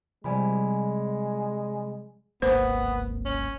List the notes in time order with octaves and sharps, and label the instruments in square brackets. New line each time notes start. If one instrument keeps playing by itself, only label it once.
[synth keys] C3 F3 G3 [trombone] G#3 [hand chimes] D5 G#5 B5
[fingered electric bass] D1 G#1 A#3 [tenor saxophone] B3 [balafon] C5
[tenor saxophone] C#4